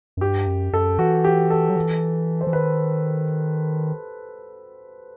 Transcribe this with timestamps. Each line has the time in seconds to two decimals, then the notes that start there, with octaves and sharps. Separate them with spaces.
0.17 F#2
0.21 G2 G4
0.47 F#2
0.73 F#2 A4
0.99 E3 F#4
1.24 G4
1.50 A4
1.70 F#3
1.76 E3
2.41 C5
2.47 E3
2.53 D#3 B4